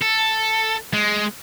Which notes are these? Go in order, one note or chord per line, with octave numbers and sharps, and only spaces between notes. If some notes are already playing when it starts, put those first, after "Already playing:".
A4
G#3